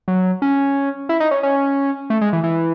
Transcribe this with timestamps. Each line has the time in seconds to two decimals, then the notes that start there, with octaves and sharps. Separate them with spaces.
0.08 F#3
0.42 C#4
1.09 E4
1.20 D#4
1.31 C#4
1.43 C#4
2.10 A3
2.21 G#3
2.33 E3
2.43 E3